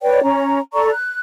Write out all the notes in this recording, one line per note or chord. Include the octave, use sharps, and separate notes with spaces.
B4 C#5 D5 G5
C#4 A#5
A4 D5 A#5 C#6
F#6